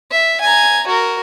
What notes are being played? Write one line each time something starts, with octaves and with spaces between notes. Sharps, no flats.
E5
G#5 A#5
F#4 A#4